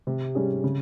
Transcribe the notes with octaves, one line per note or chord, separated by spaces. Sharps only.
C3
G3 C#4 G#4
C#3